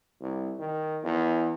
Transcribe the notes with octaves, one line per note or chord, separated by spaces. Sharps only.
C2
D#3
E2